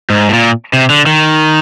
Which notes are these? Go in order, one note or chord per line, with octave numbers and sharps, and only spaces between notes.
G#2
A2
A#2
C3
D3
D#3